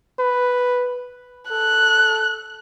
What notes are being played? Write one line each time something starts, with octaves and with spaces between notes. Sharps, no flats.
B4
A4 F#6